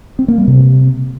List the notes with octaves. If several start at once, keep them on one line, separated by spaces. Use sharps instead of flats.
C4
A#3
G3
C3